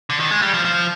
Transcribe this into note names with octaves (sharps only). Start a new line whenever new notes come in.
D3
D#3
G#3
G3
F3
F3